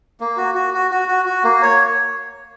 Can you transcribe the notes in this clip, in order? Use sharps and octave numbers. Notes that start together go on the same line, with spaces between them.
A#3
F#4
F#4
F#4
F#4
F#4
F#4
A#3
C#5